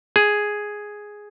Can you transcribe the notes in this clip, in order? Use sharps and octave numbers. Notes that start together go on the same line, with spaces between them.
G#4